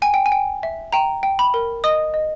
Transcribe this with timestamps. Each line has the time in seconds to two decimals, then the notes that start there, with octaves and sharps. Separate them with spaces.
0.02 G5 G#5
0.14 G5
0.26 G#5
0.32 G5
0.63 E5
0.92 G5 A#5
1.23 G5
1.39 B5
1.54 A#4
1.84 D#5 D#6
2.14 D#5